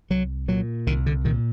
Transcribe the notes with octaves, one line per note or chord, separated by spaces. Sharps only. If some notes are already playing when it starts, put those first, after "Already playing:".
C2 F#3
A#2 F#3
C2 D#3
D3
A#2 D#3